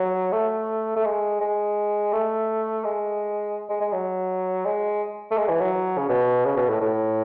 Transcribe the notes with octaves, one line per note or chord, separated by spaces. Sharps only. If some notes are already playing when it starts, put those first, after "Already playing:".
Already playing: F#3
A3
A3
G#3
G#3
A3
G#3
G#3
G#3
F#3
G#3
A3
G#3
E3
F#3
C#3
B2
C#3
B2
A2
A2